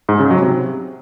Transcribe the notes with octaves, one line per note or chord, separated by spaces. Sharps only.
G#2
C#3
F#3
C3